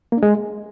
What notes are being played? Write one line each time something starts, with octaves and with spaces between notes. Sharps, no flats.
A#3
D4
G#3